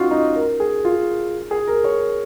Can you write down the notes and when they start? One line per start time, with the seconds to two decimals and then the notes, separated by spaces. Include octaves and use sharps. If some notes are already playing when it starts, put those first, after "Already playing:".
Already playing: C#4 D#4 F4 F#4
0.11 D#4
0.35 A#4
0.60 G#4
0.85 F4
1.51 G#4
1.67 A#4
1.84 C#5